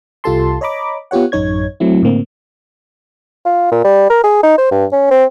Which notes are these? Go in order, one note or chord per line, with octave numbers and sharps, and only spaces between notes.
C2 F4 G4 A4 A5 C6
C#5 D#5 A#5 B5 D6
B3 F4 G4 C#5 F#5
A1 F#2 D#4 C#5 G#6
F#3 A3 C4 E4
A2 D3 A#3 C4
F4
A#2
G3
A#4
G#4
D#4
C5
G2
C#4
C4